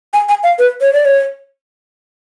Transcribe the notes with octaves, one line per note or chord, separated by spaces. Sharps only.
G#5
G#5
F5
B4
C#5
D5
C#5